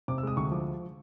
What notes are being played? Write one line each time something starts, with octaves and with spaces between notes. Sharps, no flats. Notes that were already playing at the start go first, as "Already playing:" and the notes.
C3 D6
E6
G#3 D#6
D2 C#6
F3 D6